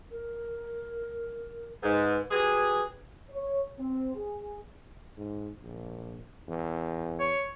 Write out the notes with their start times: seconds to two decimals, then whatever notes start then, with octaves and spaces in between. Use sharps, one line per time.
0.12 A#4
1.83 G#2 B4
2.31 F#3 G4 G#4 B4
3.29 C#5
3.78 C4
4.14 G#4
5.17 G#2
5.63 A#1
6.48 E2
7.20 C#5